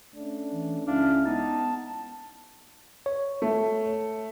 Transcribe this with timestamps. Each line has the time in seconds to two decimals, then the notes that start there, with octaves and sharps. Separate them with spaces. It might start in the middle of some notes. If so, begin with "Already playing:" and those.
0.16 A3 C#4 D4
0.52 E3
0.87 C#2 G#3 C#4 D4 E4 F5
1.26 B3 D#4 A5
3.06 C#5
3.42 A3